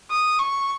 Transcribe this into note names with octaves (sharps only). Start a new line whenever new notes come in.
D#6
C#6